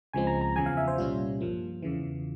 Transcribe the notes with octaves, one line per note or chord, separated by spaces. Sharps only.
C#2 C#3 F3 G#3 C4 G#5
A#5
A#5
E2 C#3 F3 G#5
F5
E5
C5
C2 A#2 G3 C#4 F4
G2 F3 A#3
E2 C#3 E3